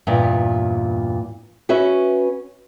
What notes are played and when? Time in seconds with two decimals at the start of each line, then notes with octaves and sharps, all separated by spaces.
0.07 E2 G2 A#2
1.69 C#4 F#4 B4 E5